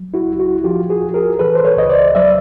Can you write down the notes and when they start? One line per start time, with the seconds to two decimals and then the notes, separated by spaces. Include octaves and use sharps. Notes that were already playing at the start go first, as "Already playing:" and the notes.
Already playing: F#3
0.14 E4 F#4
0.27 C#2
0.39 E4 F#4
0.64 F3 F4 G4
0.90 F#4 G#4
1.02 D#2
1.14 G#4 A#4
1.39 E3 A4 B4
1.55 C5
1.65 B4 C#5
1.77 C#2 D#5
1.90 C5 D5
2.15 F#3 D5 E5